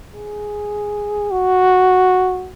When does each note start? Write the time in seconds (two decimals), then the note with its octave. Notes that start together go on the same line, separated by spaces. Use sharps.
0.15 G#4
1.31 F#4